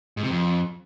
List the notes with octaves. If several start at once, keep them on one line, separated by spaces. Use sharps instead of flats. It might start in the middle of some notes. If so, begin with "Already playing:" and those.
G#2
C3
F2